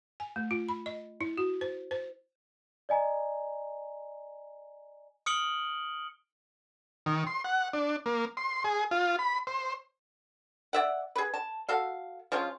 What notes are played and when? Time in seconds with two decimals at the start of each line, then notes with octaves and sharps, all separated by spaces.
0.20 G#5
0.36 A3
0.51 F4
0.69 B5
0.86 D#5
1.21 E4
1.38 F#4
1.61 C5
1.91 C5
2.89 D5 D#5 G#5 A#5
5.26 D#6 F6 C#7 D7 F#7 G7
7.06 D#3
7.27 C6
7.44 F#5
7.73 D4
8.06 A#3
8.37 C6
8.64 G#4
8.91 F4
9.19 B5
9.47 C5
10.73 D5 E5 F#5
11.16 G#4 B4
11.34 A5
11.69 F#4 A4 F5
12.32 F3 G#3 C#4 F4